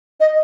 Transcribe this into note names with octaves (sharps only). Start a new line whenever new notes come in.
D#5